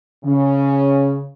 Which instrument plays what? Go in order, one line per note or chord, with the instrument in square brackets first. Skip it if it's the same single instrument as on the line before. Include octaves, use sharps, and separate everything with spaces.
[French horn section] C#3